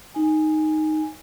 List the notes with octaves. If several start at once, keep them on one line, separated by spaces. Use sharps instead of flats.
D#4 G#5